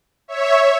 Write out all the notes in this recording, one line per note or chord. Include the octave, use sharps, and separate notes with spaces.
C#5 E5